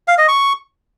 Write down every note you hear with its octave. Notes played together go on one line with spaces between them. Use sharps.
F5
D#5
C#6